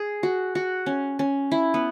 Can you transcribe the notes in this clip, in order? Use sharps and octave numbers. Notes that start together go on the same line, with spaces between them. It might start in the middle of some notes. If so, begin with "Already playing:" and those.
Already playing: G#4
F#4
F#4
C#4
C#4
E4
B3